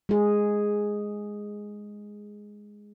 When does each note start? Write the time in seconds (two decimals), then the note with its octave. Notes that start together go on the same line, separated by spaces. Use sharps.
0.09 G#3 G#4